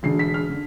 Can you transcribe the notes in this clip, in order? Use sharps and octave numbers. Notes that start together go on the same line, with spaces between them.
E1 D2 D3 C7
B6
F6
D3